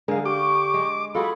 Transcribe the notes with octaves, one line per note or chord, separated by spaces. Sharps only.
D3 G#3 G#4 A#4 F5
G4 C#6 D6
G#3
F4 F#4 G#4 A4 B5